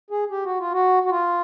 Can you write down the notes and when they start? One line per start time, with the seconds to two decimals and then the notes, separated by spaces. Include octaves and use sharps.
0.10 G#4
0.30 G4
0.44 F#4
0.59 F4
0.73 F#4
1.05 F#4
1.10 F4